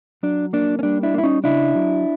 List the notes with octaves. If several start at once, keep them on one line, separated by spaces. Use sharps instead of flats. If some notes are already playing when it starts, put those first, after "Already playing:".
F#3 D4
A#3 D4
C#4
G3 D4
D4 E4
A#3
E4
C#4 D#4
C#3 D4 E4
F#3